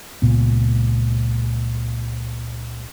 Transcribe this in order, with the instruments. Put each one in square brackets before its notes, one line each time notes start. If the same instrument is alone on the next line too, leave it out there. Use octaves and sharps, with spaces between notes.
[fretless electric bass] C#2 A#2 B3